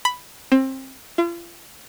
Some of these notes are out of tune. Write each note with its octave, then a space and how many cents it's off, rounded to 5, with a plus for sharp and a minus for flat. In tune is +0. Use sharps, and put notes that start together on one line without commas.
B5 +5
C4 +25
F4 -40